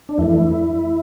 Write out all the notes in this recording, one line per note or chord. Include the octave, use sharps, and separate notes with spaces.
D4
F2 E3 A3 E4